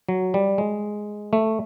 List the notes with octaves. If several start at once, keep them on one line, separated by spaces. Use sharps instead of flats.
F#3
G3
G#3
A3